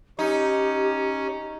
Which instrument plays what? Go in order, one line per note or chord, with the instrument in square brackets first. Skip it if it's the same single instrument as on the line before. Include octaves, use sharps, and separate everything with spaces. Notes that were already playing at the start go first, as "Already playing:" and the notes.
[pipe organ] C#4 [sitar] D#4 [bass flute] G4